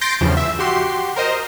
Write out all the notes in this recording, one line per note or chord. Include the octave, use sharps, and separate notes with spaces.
C6 G6 A6 A#6 C7 D7
E2 G2 C#3 F3
E5
F#4 G4 C6
A#4 C5 D#5